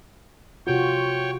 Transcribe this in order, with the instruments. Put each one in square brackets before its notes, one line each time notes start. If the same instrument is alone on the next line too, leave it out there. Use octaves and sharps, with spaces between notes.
[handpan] C3 F4 F#4 [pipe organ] C#5 G5